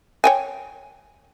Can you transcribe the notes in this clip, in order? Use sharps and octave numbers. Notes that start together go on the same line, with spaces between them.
C#5 G5 G#5